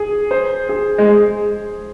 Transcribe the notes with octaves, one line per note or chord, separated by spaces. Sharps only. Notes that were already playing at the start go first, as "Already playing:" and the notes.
Already playing: G#4
C5
G#4
G#3